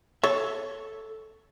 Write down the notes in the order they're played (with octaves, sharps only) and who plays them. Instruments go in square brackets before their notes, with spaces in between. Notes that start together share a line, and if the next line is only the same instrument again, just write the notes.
[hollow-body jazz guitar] A4 E5 [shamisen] C#5